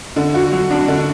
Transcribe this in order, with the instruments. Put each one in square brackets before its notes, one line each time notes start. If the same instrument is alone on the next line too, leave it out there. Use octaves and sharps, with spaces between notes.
[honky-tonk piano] D3
F#4
F#3
D4
D3